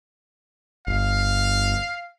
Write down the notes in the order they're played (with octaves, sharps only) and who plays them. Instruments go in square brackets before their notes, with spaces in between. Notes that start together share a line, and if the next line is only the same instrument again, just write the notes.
[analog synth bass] G1 [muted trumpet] F5